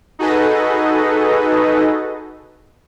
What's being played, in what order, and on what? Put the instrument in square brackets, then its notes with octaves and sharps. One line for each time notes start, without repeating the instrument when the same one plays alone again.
[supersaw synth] D#4 F#4 G#4 A4 B4 D#5